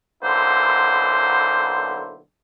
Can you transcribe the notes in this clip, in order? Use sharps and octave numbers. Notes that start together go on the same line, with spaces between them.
B1 D3 A#3 E4 C5